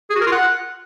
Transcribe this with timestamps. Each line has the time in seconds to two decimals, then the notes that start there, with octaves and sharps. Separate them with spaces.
0.10 G#4
0.15 F#4
0.21 A#4
0.26 F4
0.32 F#5